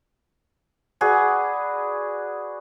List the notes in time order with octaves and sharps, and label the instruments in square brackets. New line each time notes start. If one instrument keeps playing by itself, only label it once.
[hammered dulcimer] F#4 G#4 B4 D5